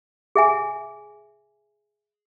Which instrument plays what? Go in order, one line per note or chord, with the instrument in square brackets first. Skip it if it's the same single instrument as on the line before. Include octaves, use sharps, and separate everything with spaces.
[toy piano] G#4 E5 G#5